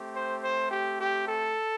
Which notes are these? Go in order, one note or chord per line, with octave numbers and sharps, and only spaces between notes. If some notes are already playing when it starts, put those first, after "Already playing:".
Already playing: A3 C4 G4
C5
C5
G4
G4
A4